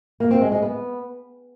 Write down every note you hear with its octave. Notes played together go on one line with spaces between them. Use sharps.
A#3
C4
G#3
G#3
B3